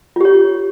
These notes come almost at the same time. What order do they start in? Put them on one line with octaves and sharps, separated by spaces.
F4 G4 C#5